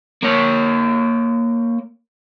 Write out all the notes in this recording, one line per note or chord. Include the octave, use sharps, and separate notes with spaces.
A#3 C#5